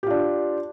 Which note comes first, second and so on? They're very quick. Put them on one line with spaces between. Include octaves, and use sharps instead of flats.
G4 F4 D4